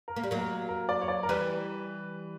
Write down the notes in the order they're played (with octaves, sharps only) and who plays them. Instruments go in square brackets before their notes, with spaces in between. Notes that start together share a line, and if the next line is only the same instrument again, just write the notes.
[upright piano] A#4
[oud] A#3
G3
F#3 A#3
[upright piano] A#4
A#4
D5
C#5
D5
A#4
[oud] E3 G3 [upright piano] B4